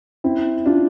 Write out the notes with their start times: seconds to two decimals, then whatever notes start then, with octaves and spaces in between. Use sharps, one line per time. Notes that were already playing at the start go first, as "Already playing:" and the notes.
0.24 C4 E4
0.66 D4 F4